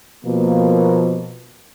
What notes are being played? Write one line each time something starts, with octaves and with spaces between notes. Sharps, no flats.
B2 F3 A#3